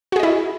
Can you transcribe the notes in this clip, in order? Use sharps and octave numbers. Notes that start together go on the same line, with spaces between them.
E4 F#4 G#4 D#5